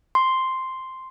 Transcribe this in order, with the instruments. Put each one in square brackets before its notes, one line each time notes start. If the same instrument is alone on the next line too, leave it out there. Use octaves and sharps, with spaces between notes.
[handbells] C6